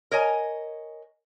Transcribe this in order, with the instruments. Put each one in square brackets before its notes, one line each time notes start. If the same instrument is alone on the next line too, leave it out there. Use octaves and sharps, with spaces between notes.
[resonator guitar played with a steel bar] A#4 C#5 D#5 G#5